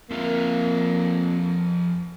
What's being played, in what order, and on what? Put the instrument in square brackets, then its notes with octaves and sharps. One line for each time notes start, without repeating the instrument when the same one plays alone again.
[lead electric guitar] F2 E5 [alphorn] A#3 [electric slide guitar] C4 F4 A#4